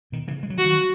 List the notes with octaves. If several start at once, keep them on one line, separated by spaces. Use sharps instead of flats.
B2 D#3
C#3 E3
G#3
F#3
E3 F#4
D#3 F#3